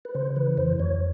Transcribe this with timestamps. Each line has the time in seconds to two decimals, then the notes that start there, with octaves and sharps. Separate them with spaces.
0.05 B4
0.15 C#3 C5
0.36 E3 B4
0.57 F2 C5
0.80 F2 C#5